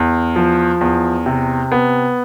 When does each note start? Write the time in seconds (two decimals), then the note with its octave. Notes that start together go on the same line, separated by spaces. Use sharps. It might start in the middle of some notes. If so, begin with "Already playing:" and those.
Already playing: E2
0.36 F3
0.81 E2
1.26 C3
1.72 B3